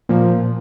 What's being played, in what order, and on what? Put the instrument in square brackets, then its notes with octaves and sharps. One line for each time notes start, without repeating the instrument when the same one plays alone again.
[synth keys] A#2 F3